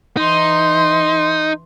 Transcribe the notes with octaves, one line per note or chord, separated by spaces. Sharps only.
E3 D#4 C6